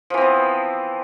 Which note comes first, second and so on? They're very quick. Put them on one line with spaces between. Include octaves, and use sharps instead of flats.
F3 E3 C4 B3